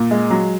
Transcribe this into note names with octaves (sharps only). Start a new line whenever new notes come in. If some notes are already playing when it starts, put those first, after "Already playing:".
Already playing: A#2
G#3
F#3